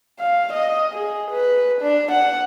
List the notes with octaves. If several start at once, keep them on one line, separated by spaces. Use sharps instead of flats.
F5
D#5
G#4
B4
D4
F#5